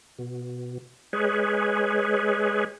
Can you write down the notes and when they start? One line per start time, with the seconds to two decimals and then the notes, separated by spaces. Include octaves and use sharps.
0.18 B2
1.13 G#3 G#4 B4 C#5